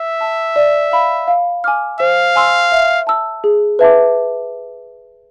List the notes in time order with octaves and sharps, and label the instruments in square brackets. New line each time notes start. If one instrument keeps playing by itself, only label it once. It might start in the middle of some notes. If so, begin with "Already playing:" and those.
Already playing: [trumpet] E5
[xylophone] A5 E6
D5
F5 B5
F5
G#5 D6 F6
[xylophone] C5 [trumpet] F5
[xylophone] G#5 C6 E6
E5
A5 E6
G#4
B4 E5 A5 D6